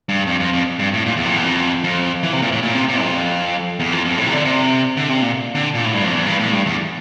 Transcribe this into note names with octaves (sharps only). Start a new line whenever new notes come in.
G2
F2
F2
F2
G2
A2
A#2
E2
F2
E2
F2
F2
E3
C3
A#2
A2
A#2
C3
C3
F2
E2
F2
F2
A2
C3
D3
C3
D3
C3
A#2
D3
A#2
A2
G2
F2
E2
G2
A2
G2
E2